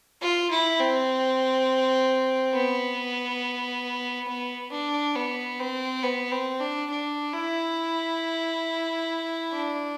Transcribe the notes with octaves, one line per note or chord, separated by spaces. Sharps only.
F4
E4
C4
B3
B3
D4
B3
C4
B3
C4
D4
D4
E4
D4